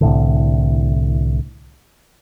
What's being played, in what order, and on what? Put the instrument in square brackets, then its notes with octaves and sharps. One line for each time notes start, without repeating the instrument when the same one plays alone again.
[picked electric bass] C2 A2 D3